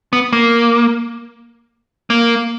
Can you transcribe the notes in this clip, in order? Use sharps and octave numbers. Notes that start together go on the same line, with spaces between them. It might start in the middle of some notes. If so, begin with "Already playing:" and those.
B3
A#3
A#3